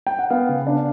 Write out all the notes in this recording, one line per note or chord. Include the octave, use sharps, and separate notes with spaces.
G5
F#5
B3 F5
C#3
D4